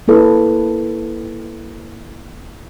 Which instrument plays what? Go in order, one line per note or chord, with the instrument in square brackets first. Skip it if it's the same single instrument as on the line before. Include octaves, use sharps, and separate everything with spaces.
[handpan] A#3 E4 A4 B4